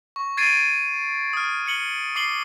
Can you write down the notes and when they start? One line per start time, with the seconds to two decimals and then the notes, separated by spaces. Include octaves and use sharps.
0.16 C#6
0.37 G#6 A6 C7 D7 D#7
1.33 D#6 F6
1.66 F6 C#7 F#7 G7
2.16 D6 C7 F#7 G7